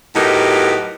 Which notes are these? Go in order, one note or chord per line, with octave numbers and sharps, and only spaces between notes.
A2 F#3 B3 D#4 G4 A#4